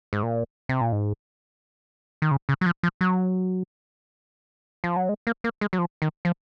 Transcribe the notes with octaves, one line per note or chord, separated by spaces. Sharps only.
G#2
A#2
C3
A#2
G#2
D#3
C#3
C#3
F#3
F3
F3
F#3
F3
F#3
G#3
A#3
A#3
G#3
F#3
F3
D#3
F3